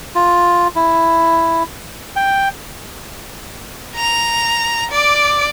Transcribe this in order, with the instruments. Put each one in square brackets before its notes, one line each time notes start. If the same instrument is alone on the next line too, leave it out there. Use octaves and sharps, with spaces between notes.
[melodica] F4
E4
G5
[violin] A#5 F7
D5 D6